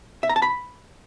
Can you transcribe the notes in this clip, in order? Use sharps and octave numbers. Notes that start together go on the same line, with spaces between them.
E5
A#5
A5
B5